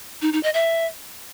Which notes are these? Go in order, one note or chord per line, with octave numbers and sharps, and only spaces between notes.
D#4
D#4
D#5
E5